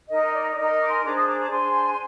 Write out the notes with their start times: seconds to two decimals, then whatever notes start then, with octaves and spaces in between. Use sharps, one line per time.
0.10 D#4 A#4 D#5
0.33 D5
0.50 D5
0.57 D#4 A#4 D#5
0.72 D#5
0.82 D6
0.88 G#5 C6
1.03 D4 G#4 C5 A#5 D6
1.15 C6 D#6
1.27 A#5 D6
1.39 A#5 D6
1.50 D4 G#4 C5 G#5 C6
1.89 C6